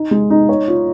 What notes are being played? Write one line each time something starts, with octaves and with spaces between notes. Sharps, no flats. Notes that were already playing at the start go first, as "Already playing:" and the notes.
Already playing: D#4
G#3
D#4
C#5
F4